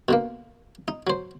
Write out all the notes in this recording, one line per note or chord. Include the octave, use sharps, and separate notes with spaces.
B2 D3 A#3
D#4
F#3 C5